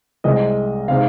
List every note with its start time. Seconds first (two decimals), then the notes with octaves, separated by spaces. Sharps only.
0.24 C2 C3 G#3 C4 D#5
0.88 C3 G#3 C4 D#4 F5